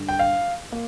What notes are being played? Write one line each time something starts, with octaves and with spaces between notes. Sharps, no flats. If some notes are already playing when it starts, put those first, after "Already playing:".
Already playing: G2 D3 G3
G5
F5
A#3